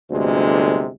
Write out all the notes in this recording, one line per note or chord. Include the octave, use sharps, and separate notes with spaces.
G1 D2 C3 G#3